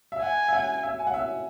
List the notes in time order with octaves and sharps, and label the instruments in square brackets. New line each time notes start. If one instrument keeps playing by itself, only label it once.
[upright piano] E5
[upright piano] F#5 [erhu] G#5
[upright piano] E5
F#5
E5
G#5
F#5
E5